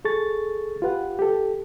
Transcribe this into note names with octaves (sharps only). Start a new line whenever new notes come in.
G#4 A4 C#6 A6
F4 G4 B4 F#5
G4 A4